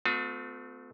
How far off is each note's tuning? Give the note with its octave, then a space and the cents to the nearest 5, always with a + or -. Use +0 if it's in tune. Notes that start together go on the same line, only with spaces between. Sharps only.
A3 +0 C4 -45 F4 +45